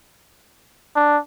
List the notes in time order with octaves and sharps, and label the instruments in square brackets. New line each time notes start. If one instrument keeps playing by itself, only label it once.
[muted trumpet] D4